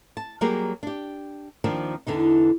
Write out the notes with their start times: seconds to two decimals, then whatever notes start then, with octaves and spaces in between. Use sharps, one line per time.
0.17 A5
0.41 F#3 G3 A#3 G4 G#4 A#4
0.83 D4 G4
1.64 D#2 D#3 F3 C4 D4
2.07 E2 D3 E3 D#4